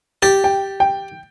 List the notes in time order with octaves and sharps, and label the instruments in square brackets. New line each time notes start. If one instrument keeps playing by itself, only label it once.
[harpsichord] G4 [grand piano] A6
[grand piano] G5
G5